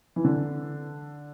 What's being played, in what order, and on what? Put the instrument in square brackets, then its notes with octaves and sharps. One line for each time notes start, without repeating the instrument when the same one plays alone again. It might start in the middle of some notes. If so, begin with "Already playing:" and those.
[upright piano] E3
D3